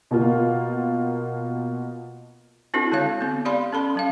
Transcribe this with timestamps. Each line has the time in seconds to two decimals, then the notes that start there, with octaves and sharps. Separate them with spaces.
0.11 B2 A#3 F4
2.74 C4 D4 E4 F#4 A4
2.92 D3 G#3 D4 C#5 F5
3.21 B3 C4
3.45 G4 D5 F5 B5 C6
3.73 C#4 A4 B5 C6
3.95 F#3 C#4 F5